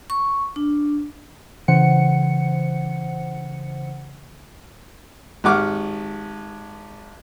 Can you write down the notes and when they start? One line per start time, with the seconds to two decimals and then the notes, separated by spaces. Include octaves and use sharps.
0.10 C#6
0.56 D4
1.68 C#3 E3 C5 F#5 C#7
5.44 G#1 G4 F#5 C#6 D6 F6